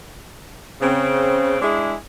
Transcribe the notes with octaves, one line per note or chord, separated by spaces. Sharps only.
C#3 C4
G#3 D4 E4 G#4